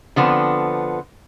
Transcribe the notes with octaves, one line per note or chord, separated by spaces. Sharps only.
D3 F3 B3 C4